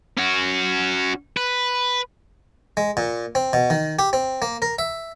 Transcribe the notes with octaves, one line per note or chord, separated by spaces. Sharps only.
C#4 F#4
B4
G#3
A#2
C4
B2
D#3
G4
C4
A#3
A#4
E5